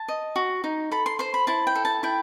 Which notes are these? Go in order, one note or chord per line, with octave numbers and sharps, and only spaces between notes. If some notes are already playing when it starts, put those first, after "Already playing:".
Already playing: A5
D#5
F#4
D#4
A4 B5
C6
C5 C6
B5
E4 A5
G5
A4
A5
E4 G5